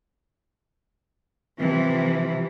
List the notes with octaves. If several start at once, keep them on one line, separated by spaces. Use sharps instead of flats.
C3 E3 F3